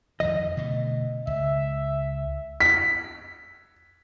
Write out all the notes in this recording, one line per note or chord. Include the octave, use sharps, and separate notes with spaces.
F2 D#3 E3 D#5
B2 D3 A3
C#2 E5
B6